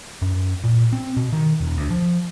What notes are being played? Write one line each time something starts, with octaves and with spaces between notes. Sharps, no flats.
F#2
A#2
C4
B2
D#3
E1
D2
F3